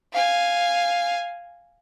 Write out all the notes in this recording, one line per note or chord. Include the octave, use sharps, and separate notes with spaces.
F5 G#5